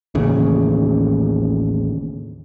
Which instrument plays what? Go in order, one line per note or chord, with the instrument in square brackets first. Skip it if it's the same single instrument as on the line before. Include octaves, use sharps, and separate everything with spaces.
[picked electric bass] A1 D#2 C#3